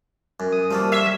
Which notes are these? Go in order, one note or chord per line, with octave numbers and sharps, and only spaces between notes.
F#2
D#6
F3 G3 A3 A#3
C#5 E5